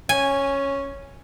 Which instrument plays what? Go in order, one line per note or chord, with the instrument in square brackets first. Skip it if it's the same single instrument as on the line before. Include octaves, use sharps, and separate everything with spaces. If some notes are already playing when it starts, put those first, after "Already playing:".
[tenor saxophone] C#4 [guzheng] G#5